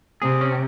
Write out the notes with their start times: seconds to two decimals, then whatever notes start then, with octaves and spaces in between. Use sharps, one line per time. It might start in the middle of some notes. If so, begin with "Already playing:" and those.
0.22 C3 G#4
0.41 C#4